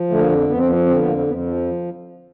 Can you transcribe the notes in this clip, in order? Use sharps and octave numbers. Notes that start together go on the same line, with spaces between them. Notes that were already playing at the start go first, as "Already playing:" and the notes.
Already playing: F3
D3 A3
A#3
F2
F2 B3
C4
F3 B3
D3 C4
B3
F2 A#3
F2 B3
F3